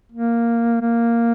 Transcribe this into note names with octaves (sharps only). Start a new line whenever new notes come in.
A#3
A#3